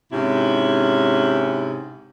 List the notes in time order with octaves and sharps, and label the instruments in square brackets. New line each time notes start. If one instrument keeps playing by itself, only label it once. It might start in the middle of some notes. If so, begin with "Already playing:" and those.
[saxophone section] G#2 C3 C#4 E4